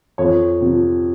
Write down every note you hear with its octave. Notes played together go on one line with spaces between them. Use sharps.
F2 C#5
C3 F3